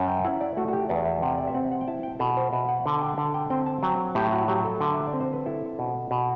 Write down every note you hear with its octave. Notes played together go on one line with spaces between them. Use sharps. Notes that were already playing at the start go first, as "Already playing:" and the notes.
Already playing: F#2
G5
E4 F#5
D5
A3 F#4
F#4
G4
E2 D5
E5
C3 F#5
D5
E5
C4 F#5
F#5
G5
E4 A5
G5
B2 A4
C5
B2 E5
F#5
D3
G5
D3
G5
C4 G5
A5
F#3 G5
A2 G4
F#4
F#3 G4
A4
D3
E5
D5
C4
C5
B4
E4 A4
B2
B2